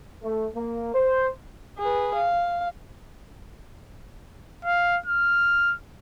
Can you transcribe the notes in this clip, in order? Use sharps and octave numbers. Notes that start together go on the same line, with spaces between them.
A3
A#3
C5
G#4 B4
F5
F5
F6